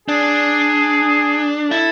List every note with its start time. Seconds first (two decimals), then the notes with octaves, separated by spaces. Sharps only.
0.08 D4 G#4
1.71 E4 A4